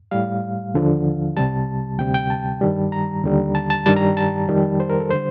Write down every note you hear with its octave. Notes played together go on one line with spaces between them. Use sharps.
A2 G3 F5
D#2 D3 F3
C2 C3 G3 A5
D2 C3 G3 G5
G5
A5
G2 D#3 G3
A#5
D#2 D3 G3
A5
A5
G2 D#3 G3 A5
A#5
A5
F2 D#3 G3
C5
A#4
A4
D3 G3 C5